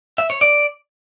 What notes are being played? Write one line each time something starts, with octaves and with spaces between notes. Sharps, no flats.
E5
C#5
D5